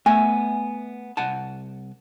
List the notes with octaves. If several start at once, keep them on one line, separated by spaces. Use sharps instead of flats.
A3 B3 E5 G#5
C2 F#5 A5